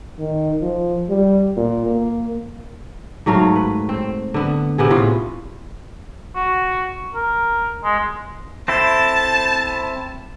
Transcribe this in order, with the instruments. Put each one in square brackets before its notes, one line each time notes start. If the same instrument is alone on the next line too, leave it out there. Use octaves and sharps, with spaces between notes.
[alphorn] D#3
F3
G3
A#2
A#3
[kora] G#2 F#3 A3 F5
B4
C4
D3 B3
C3 B3 G#4
A2 F4 B4
[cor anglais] F#4
A#4
G#3
[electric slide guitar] C4 E4 A4 [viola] A5